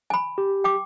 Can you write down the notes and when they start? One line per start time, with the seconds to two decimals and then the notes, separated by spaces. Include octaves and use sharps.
0.10 G#5 B5
0.38 G4
0.64 G5 D6